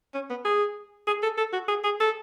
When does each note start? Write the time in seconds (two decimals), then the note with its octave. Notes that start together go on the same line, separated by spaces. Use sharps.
0.14 C#4
0.30 B3
0.45 G#4
1.07 G#4
1.23 A4
1.38 A4
1.53 F#4
1.69 G#4
1.84 G#4
2.01 A4